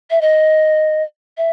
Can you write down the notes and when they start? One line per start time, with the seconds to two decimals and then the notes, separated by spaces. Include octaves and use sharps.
0.10 E5
0.21 D#5
1.37 E5